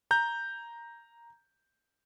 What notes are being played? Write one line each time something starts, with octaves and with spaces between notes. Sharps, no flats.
A#5 G6